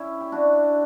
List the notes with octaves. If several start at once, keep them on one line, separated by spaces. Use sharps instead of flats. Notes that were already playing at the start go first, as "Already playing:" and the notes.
Already playing: C#4 E4
G4
D4 F#4